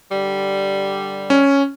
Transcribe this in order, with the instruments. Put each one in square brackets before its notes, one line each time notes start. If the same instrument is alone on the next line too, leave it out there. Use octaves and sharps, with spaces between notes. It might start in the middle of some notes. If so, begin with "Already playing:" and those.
[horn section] D3 G3
[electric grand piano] C#4